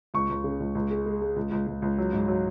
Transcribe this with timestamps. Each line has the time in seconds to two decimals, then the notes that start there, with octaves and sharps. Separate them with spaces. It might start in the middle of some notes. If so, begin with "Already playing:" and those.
0.14 C#2 C#6
0.29 C#2
0.44 C#3
0.60 C#2
0.75 C#2
0.91 G#3
1.06 G#3
1.21 G#3
1.36 C#2
1.51 C#2
1.67 C#2
1.82 C#2
1.98 F#3
2.13 G#2
2.28 F#3